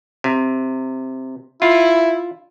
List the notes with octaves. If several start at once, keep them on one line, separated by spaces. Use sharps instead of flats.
C3
E4 F4